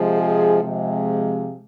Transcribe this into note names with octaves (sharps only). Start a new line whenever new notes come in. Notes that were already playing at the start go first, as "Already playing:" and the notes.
Already playing: C3 F3 G#3
G#4
C3 F3 G#3